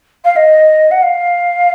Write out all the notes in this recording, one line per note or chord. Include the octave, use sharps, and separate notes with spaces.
F5
D#5
F#5
F5